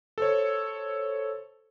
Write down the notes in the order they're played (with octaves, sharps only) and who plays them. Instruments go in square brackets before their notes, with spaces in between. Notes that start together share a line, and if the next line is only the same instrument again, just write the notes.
[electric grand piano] A4 C5 C#5